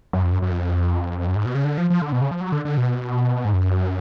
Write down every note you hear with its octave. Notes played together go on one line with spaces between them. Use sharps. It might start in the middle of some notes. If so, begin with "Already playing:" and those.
F#2
F2
F#2
F#2
F2
F#2
G#2
B2
C#3
D3
F3
F3
D3
B2
C#3
F3
F#3
D3
D3
B2
G#2
F#2